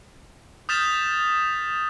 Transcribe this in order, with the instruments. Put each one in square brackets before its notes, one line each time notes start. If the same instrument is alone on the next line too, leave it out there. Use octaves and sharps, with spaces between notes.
[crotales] D#6 F6 G6 A6 B6 E7